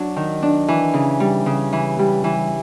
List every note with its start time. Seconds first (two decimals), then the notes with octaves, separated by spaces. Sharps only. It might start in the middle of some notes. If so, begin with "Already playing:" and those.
Already playing: F#3 D4
0.16 D#3
0.42 D4
0.68 E3
0.94 C#3
1.20 G3
1.46 C#3
1.73 E3
1.99 G3
2.24 E3